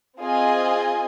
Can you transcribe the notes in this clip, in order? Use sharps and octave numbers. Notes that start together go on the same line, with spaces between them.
C4 F4 G#4 D#5 G#5